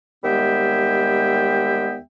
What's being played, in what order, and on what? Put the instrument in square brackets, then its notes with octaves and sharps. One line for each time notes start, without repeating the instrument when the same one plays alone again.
[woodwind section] D#2 G3 G#3 B3 E5 G5